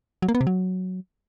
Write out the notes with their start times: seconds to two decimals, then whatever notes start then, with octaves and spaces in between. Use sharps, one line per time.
0.22 F#3
0.28 A#3
0.35 B3
0.41 C3
0.47 F#3